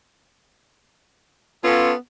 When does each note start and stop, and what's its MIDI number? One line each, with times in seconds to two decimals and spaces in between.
1.64 1.95 59
1.64 1.92 61
1.64 1.92 65
1.64 1.92 69